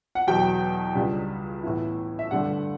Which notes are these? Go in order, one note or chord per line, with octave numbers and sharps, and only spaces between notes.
F#5
E2 B2 F#3 G5
C#2 C#3 G3 D4
A2 E3 B3 E4
E5
G2 D3 A3 D4 F#5